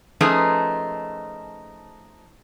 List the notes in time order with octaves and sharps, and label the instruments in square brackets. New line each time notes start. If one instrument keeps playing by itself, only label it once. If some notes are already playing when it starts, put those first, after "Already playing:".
[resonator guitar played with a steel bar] F3 A3 C#4 D#4 G#4 B4